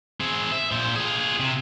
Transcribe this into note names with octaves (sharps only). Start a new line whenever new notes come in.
C4 G#4
E5
A#2 C5
F4 G#4
C3